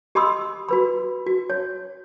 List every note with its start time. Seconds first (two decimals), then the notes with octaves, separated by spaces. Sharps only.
0.15 G4 D#5 B5 C6 D#6 E6
0.69 F#4 B4 B5
1.26 F#4
1.50 C#5